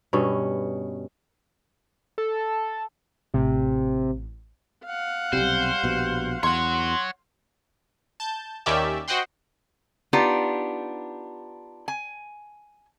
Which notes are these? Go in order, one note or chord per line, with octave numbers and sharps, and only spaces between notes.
G2 B2 C#4
A4
A1 A2 C3
F5 F#5
B1 C3 G3 C5
A#1 B2
E2 C#5 F#5 C6
A5 G6
D#2 D#3 C#4 G4 D5 E5
F#4 C5 D#5 F#5 G5 C6
B3 D4 D#4 F4 G4
G#5